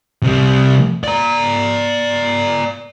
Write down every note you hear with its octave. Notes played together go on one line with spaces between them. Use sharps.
C3 G3
D5 A#5